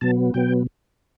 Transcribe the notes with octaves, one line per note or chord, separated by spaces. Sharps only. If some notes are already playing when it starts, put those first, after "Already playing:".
B2 F#3 B3 A5
B2 F#3 B3 G5